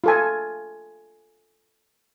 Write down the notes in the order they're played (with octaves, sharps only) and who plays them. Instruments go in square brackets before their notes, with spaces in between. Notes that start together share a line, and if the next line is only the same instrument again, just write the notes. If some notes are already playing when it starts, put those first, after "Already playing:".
[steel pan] F4 A4 G#5